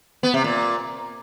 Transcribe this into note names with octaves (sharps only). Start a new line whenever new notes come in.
B3
C3
A#2